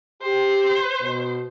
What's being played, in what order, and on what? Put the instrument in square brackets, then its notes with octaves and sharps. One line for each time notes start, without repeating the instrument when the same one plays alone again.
[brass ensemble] G4 [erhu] C5
[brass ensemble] B2